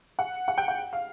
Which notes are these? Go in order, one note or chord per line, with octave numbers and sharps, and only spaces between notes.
F#5
F#5
G5
F#5
F5